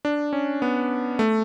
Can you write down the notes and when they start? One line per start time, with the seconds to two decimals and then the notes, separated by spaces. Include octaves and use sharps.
0.05 D4
0.33 C#4
0.62 B3
1.19 A3